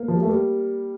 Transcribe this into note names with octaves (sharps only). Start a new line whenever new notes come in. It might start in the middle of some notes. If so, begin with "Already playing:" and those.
Already playing: A#3
F3
G3
A3
G3 A#3